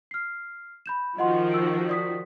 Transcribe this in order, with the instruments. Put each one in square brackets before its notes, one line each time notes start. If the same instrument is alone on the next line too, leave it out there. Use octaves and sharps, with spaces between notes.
[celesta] F6 C7
B5 G6 E7
[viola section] D#3 F3 F#4 [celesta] D#5 F#5 C6
[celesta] E6 D7
D5 D#6 B6